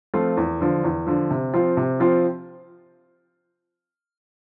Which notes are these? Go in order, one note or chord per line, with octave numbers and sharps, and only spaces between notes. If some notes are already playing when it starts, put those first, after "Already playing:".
F3 A3 C4 F4
E2
D3 F3
E2
D3 F3
C3
F3 C4 F4
C3
F3 C4 F4